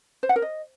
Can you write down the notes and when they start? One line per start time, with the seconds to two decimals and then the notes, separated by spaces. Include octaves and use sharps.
0.23 C5
0.29 F#5
0.36 A#4
0.42 D#5